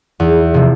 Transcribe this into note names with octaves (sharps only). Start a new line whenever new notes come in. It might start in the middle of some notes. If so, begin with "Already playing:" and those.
E2
C3 F3